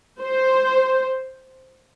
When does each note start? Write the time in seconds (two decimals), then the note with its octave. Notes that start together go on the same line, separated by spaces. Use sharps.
0.20 C5